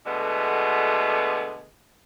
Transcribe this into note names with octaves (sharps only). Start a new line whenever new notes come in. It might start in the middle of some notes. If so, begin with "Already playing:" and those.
B2 D3 G#3 A3 B3